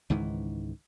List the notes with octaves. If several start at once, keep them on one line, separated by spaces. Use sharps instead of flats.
C#2 G#2 D#3 E3